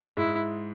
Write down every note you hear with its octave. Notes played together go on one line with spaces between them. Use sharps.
G#2 G#3 E4